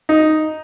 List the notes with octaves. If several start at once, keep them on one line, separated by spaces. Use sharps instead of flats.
D#4